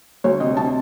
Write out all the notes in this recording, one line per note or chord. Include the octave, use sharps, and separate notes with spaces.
D2 C#5
C3 D#5
C3 A5